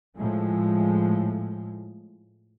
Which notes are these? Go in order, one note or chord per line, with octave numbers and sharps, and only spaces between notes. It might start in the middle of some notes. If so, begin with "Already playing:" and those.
A2 F3 G#3